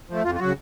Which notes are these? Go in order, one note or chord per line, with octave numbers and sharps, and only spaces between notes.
F3 A3
F2 F4
F4
C#3 F#3 F#4